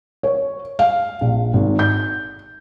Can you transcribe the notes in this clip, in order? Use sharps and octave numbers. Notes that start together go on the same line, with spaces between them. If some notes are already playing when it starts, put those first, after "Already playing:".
C#5
F5
A#1
G#1
G6